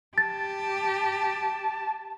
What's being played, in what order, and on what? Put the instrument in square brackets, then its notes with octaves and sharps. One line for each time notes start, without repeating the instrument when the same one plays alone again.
[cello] G4 [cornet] A5 [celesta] A6